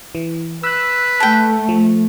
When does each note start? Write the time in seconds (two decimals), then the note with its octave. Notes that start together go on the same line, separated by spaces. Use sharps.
0.15 E3
0.64 B4 E6 F#6
1.20 A3 G5 A5
1.69 F3